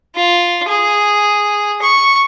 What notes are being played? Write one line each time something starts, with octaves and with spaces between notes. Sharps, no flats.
F4
G#4
C#6